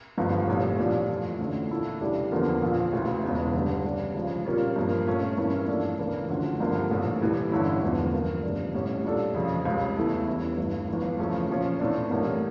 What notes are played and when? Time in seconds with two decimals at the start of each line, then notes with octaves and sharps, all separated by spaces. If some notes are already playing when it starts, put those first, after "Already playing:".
0.18 G1 G2 D3 F3
0.48 A#1 A2 G3
0.78 A#1 A#2 G3 D4
1.09 F2 E3 A3
1.39 D2 D3 A3 C#4 F4
1.70 A#2 A3 E4 A4
2.01 C#3 E3 G3 D4 G4
2.32 E2 D3 F3 A#3
2.61 A#1 A#2 F3
2.93 D2 C#3 E3
3.23 E1 E2 C#3
3.54 G1 G2 D3 G3 D4
3.84 C#3 G3 D4 G4
4.15 C#2 C#3 F3
4.45 A#2 G3 A#3 C#4 F4
4.76 G2 F3 A#3
5.07 A#2 A3 C#4
5.38 G2 E3 A#3 C#4 E4
5.68 A#1 A#2 A3 D4 A4
5.99 C#2 C#3 E3 A#3 D4
6.29 D2 D3 F3 C#4
6.60 G2 D3 F3 A#3
6.91 A#1 A2 E3
7.22 A2 E3 G3
7.52 G2 D3 G3 C#4 E4
7.82 E1 E2 D3 F3 A3
8.13 G2 F3 A#3
8.43 G1 F2 C#3 G3 D4
8.74 A1 A2 G3 C#4
9.04 A#2 G3 D4 A4
9.35 F2 C#3 F3
9.65 C#2 C#3 G3
9.97 E2 E3 A3 E4 A4
10.28 E2 E3 G3 C#4 E4
10.57 G1 G2 E3 A3
10.88 G1 F2 E3
11.19 C#3 F3 A3 C#4
11.49 A#2 F3 C#4 F4
11.79 A2 E3 A3 D4
12.10 A1 A2 G3 A#3 D4